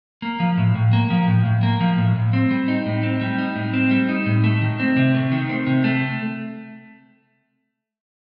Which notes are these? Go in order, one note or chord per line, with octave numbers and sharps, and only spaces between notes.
A#3
F3
A2
A2
A#3
F3
A2
A2
A#3
F3
A2
A2
C4
G3
D#4
A2
C4
G3
D#4
A2
C4
G3
D#4
A2
A3
D#3
C4
C3
A3
D#3
C4
C3
A3